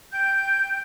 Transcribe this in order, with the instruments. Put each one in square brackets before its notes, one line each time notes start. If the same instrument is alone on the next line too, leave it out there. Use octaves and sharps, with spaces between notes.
[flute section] G5 G6